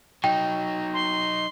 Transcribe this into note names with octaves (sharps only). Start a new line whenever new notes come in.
F#3 D#4 G5
C6